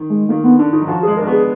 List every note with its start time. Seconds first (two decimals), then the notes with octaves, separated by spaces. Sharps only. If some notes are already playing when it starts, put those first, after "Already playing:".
Already playing: D#3
0.10 G#3
0.29 D#3 A#3
0.44 D3 B3
0.59 D3 D4
0.73 D#3 D#4
0.82 F#3
0.88 F3 F#4
1.03 G#3 G#4
1.17 D4 A#4
1.27 B3 F#4 G#4